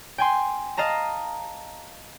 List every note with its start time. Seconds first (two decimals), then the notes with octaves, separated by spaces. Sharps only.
0.18 G5 G#5 C6
0.77 D#5 F5 A5 A#5